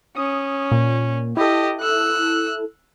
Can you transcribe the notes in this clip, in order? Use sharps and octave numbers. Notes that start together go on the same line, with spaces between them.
C#4 D#6
A#2
E4 G4 A4 D#5
E6 F#6